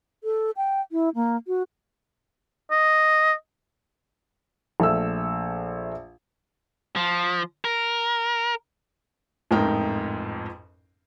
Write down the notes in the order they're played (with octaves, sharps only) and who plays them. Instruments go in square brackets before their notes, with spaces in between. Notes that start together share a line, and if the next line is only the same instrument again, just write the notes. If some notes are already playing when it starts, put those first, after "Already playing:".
[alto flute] A4
G5
E4
A#3
F#4
[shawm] D#5
[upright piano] A#1 A3 E5 E6
[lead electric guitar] F3
A#4
[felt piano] A1 F2 G#2 D#4 A#4 G5